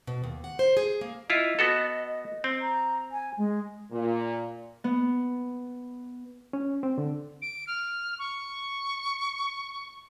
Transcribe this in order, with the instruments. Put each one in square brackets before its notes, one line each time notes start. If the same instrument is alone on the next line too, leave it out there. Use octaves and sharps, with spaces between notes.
[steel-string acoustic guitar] B2
D#2
F#5
C5
G#4
A#3
[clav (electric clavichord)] E4 F4 [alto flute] D#5
[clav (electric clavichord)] B3 F#4 A4
C4
[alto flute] A#5
G#5
G#3
[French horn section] A#2
[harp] B3
[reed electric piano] C#4
C4
D3
[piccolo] D7
F6
C#6